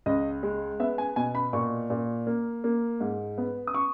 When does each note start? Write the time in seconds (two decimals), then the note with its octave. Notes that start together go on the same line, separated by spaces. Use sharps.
0.06 C#2 D#5
0.43 G#3
0.80 B3 E5
0.98 G#5
1.16 B2 G#5
1.35 B5
1.53 A#2 C#6
1.90 A#2
2.27 A#3
2.64 A#3
3.00 G#2
3.38 B3
3.67 D#6
3.74 C#6